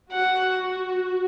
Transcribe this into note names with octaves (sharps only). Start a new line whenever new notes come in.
F#4 F#5